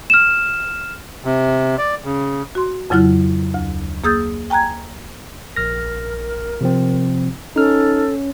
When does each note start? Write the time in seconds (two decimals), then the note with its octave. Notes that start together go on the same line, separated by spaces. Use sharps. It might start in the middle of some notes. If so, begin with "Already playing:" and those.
0.10 F6 E7
1.25 C3
1.78 D5
2.04 C#3
2.55 F#4 C6
2.90 F2 C#3 F#3 E4 F6 F#6
3.54 D2
4.04 A#3 G#4 D#6 E6 G6 A6
4.50 G5 G#5 A#5 F#6 G#6
5.56 A#1 A#4 F6 A#6
6.61 C3 F3 C4
7.56 C#4 D#4 A4 F6